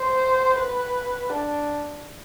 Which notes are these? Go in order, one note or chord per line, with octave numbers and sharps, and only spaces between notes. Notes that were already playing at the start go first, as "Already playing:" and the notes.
Already playing: C5
B4
D4